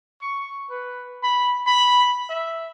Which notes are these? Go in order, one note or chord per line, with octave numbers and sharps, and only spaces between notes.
C#6
B4
B5
B5
E5